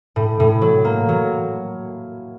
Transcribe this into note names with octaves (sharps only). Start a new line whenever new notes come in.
A2
A2
F#3
A#3
F#3